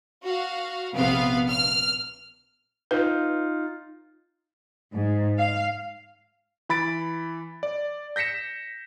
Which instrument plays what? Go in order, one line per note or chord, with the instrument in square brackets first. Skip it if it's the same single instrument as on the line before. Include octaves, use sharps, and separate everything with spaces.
[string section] F#4 F5
A#1 C3 B3 B4 F5
F6
[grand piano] D#4 F4 [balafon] B4
[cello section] G#2
F5
[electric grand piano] E3 B5 A6 D7
D5
G6 A#6 B6 C#7 E7